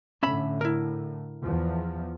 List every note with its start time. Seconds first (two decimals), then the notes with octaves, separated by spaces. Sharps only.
0.23 A2 D3 C#4 E5 B5
0.61 E4 A#4
1.42 E2 F3